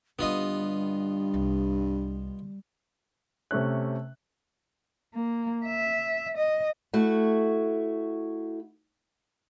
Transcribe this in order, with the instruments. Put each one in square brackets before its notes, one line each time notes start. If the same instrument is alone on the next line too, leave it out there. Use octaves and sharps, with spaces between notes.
[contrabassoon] G2 [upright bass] D3 D#3 [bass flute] G3 [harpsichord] B3 F4 D#5
[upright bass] C2
[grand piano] C3 A3 C#4 F#6
[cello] A#3
E5
D#5
[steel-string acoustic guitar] A3 E4 F#4